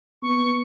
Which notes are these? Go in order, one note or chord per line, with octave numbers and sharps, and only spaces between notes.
B3 C#6